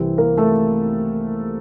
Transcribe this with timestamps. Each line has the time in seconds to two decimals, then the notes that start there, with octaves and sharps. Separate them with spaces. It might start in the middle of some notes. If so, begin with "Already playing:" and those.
Already playing: C2 C3 E3 C4 C5
0.18 A#3 A#4
0.38 A3 A4